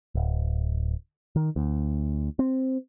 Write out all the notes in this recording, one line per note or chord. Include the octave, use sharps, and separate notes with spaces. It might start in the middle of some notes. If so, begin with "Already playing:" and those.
D1
D#3
D2
C4